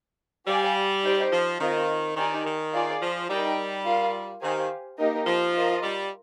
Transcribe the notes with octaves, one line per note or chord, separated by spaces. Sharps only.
G3 G4 D5 F5 G#5
D#4 G4 C5 D#5 G5
F3
D#3 C4 F4 A#4 D#5
D#3 D#4 G4 D5 G#5
D#3
F4 G#4 D5 F5
F3
G3 D#4 A#4 D#5 G5
F4 A#4 F5
D#3 G4 C5 F5 G#5
A#3 D#4 G4 A#4 D#5
F3
F4 A#4 D#5
G3